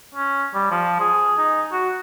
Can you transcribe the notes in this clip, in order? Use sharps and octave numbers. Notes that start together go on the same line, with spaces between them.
C#4
G3
F3
G#4
D#4
F#4